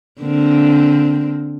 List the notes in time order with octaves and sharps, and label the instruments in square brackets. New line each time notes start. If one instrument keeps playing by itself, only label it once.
[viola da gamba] D3 A#3 C4